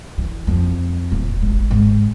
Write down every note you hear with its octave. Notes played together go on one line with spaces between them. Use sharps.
E3
F2
D#1
G#1
G#2